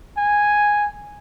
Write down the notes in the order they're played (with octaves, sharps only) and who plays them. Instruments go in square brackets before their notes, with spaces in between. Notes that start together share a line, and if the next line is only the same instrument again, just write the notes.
[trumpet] G#5